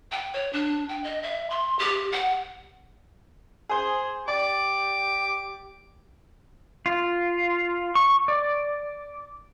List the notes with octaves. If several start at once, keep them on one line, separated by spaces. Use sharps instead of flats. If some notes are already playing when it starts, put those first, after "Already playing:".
G5
C#5
D4
G5
D#5
E5
C6
G4
F#5
G#4 C5
G4 D5 D6
F4
C#6
D5